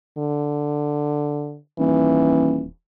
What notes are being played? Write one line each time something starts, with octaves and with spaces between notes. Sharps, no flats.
D3
D#1 E3